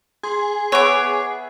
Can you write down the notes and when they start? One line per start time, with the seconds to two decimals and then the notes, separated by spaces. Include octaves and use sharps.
0.23 G#4 C6
0.72 B3 B4 C#5 E5 D6